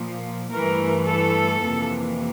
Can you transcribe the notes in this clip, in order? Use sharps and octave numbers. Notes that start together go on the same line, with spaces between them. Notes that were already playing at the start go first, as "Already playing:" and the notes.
Already playing: A#2 F3 A#3
G2 E3 A3 A#4
A4
F2 C3 E3 A#3